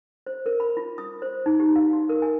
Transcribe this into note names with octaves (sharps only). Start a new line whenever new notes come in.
C5
A#4
B5
F4
D#6
C5
D#4
G4
F5
F#4
A#4
G#5